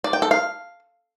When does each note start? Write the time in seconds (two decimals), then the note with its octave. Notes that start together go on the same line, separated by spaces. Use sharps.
0.04 D5
0.13 G5
0.22 A4
0.31 F5